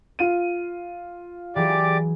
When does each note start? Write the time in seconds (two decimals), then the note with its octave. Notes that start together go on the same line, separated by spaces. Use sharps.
0.19 F4 D#7
1.56 E3 F#3 G4 G#4 D5 D6